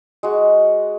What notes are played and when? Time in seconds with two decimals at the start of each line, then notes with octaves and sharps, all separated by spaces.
0.23 G#3 F#4